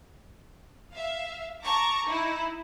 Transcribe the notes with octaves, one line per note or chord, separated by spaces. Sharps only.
E5 F5
A5 A#5 C#6 D6
D#4 E4